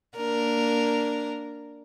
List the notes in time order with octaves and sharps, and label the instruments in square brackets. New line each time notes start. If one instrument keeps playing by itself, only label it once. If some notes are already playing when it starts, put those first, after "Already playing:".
[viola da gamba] A#3 D4 A#4